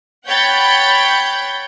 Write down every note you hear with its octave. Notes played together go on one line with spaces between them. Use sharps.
C#5 F#5 G5 B5 G6 A6